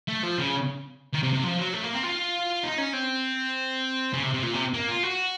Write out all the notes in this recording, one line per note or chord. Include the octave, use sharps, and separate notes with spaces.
A3
F3
C#3
D#3
C3
C3
F3
F#3
A3
A#3
C4
F4
D#4
C#4
C4
C#3
C3
C3
A#2
C3
A#3
F4
F#4